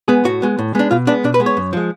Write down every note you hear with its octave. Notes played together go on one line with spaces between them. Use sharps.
G#3 B3 G#4
A2 F#4
G#3 B3
A2
G#3 B3 D4
B2 F4
G#3 B3 D4
B2 D4
B4
G#3 B3
C#5
F#2
F3 G#3